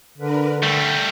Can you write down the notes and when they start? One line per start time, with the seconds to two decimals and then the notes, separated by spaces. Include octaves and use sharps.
0.18 D3 D4 A#4 B4
0.62 G3 A3 A#6